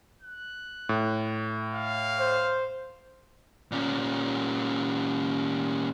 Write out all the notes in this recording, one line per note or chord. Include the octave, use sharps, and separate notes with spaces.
F#6
A2
F5
C5
A#2 C#4